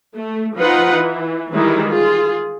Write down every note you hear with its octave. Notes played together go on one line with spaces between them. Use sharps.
A3
F3 D#4 F4 B4 F#5
E3
D#3 E3 G3 G#3 D#4 E4
F4 G#4